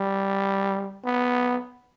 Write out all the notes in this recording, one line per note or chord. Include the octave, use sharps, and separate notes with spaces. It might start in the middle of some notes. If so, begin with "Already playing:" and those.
Already playing: G3
B3